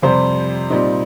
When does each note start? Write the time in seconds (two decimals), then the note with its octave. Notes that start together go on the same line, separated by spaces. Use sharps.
0.02 F2 C3 G3 C5
0.70 A#2 G3 C4 D#4